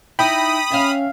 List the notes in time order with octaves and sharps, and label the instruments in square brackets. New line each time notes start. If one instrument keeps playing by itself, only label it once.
[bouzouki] D#4 E4 [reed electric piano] G5 [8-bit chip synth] B5 D#6
[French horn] C#4 [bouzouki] E5 F5